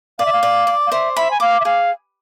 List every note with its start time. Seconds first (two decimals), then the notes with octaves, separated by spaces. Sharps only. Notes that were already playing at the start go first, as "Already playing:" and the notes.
0.19 D5 F5
0.25 E5
0.32 F5
0.43 D5
0.67 D5
0.86 F5
0.92 C5 E5
1.16 E5 B5
1.31 G#5
1.40 F5 D6
1.60 E5
1.65 G#4 F5